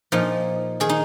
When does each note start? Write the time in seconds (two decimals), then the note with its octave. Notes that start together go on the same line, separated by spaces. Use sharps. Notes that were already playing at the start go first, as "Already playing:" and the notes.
0.12 A#2 F3 D#4
0.80 D#3 G#4
0.89 D#4